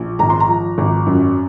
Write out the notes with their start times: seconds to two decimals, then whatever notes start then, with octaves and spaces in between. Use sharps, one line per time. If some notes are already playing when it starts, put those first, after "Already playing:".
Already playing: A#1
0.19 G#1 A#5
0.30 C6
0.40 A#5
0.48 F3
0.78 G#1
1.06 F#2